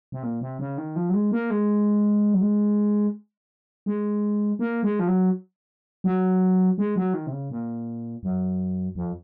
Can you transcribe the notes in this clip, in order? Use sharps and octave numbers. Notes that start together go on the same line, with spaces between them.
C3
A#2
C3
C#3
D#3
F3
F#3
G#3
A#3
G#3
F#3
G#3
G#3
A#3
G#3
F3
F#3
F#3
G#3
F#3
D#3
C3
C#3
A#2
F#2
F2